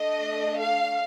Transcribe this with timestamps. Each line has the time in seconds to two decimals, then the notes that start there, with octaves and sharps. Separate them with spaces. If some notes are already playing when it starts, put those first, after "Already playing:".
Already playing: A3 D4 A4 D#5
0.58 F5